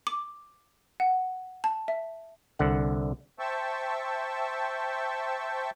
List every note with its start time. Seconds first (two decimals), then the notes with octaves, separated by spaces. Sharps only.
0.07 D6
1.00 F#5
1.64 A5
1.88 E5
2.59 C2 D3 F#5
3.39 C5 E5 G5 A5 C#6 E6